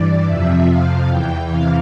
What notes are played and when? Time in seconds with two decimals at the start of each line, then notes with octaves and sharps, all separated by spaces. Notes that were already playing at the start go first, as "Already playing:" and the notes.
Already playing: G2 E3 D5
0.27 F2 C3 F3 E5
0.67 F2 C3 F3 F5
1.09 E2 E3 G5
1.50 E2 C3 E3 F5